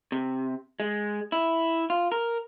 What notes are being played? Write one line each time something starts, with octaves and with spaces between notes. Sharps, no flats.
C3
G#3
E4
F4
A#4